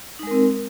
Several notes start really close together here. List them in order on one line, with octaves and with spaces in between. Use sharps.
D#4 G#3 A#4 C4